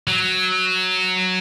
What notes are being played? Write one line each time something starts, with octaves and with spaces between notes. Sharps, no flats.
F#3